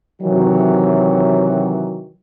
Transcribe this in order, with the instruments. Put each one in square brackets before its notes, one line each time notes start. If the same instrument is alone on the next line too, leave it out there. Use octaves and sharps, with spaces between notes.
[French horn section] C3 D#3 E3 F#3